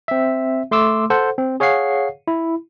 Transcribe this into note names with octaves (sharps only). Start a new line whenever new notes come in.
C4 E5
A3 C6 D6 E6
A4 C5 F#5
C4
G#4 C#5 F5 F#5 C7
E4